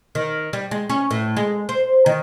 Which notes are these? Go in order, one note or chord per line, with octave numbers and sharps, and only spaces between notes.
D#3
G3
G#3
C#4
A2
G#3
C5
D#3